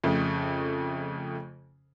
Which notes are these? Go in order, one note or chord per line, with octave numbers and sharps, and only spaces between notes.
F2 C#3 A3